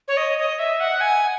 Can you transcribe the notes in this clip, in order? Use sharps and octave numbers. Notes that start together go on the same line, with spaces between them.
C#5
D#5
D#5
E5
F#5
G#5